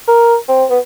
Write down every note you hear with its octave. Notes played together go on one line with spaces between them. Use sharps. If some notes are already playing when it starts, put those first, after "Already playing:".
A#4
C4
B3